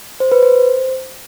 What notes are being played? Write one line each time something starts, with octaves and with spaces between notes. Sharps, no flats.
C5
B4
C5